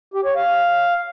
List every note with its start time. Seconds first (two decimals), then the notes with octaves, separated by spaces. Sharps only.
0.14 G4
0.25 C#5
0.36 F5